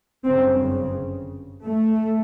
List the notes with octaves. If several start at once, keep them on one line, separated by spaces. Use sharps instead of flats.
G1 F#2 C#3 C4
A3